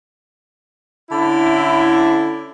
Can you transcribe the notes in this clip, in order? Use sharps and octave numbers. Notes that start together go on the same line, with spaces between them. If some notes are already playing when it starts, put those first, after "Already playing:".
D3 C#4 E4